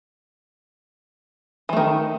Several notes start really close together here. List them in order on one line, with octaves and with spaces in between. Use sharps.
E3 A3 D#3